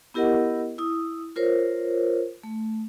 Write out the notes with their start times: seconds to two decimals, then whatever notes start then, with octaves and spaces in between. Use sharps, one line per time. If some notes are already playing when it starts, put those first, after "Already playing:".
0.14 B3 E4 G4 A#4 D#5 F#5
0.78 E4 D#6
1.36 F4 A#4 C5 C#5
2.43 A3